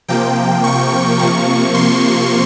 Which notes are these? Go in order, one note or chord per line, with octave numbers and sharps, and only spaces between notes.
C3 F3 A#3 G5
C#6
C3 F3 A#3 C#6
C6